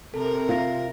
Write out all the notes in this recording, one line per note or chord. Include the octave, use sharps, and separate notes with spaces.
C3 A4 A#4
F4 E5 A#6